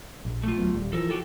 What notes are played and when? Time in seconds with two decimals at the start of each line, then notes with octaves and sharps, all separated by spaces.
0.25 A#1
0.44 A3 F4
0.57 D2 F#3 B3
0.75 D#1 G3
0.93 E3 F3 A4 A#4
1.10 F#4 G4 A4